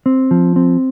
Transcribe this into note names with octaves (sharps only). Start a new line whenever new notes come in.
C4
F3
C4